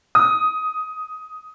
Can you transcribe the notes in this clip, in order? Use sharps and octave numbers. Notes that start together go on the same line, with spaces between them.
D#6